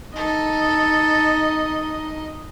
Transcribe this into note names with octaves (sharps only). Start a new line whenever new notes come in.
D#4 A4 D#5